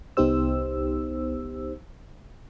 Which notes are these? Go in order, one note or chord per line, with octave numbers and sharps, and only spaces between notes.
C2 B3 D#4 G4 C5 E6